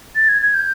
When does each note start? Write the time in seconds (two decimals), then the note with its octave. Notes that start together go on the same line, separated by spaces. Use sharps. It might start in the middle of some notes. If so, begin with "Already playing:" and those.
0.16 A6
0.29 G#6
0.42 G#6
0.54 G6